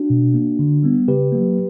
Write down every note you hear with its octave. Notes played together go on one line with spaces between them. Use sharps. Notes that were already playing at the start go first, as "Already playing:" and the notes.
Already playing: D4 F#4
B2
A#3
D3
G3 B3
C#3 G4 B4
F#3 A#3